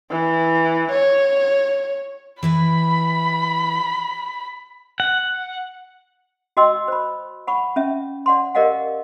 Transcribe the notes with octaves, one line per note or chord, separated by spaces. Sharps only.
E3
C#5
E3 E4 B4 B5
F#5
F#4 D#5 G5 C6 E6
C5 B5
F#5 B5 C#6
C#4 E5
D5 F#5 C6
G4 A#4 D5 D#5 F5 F#5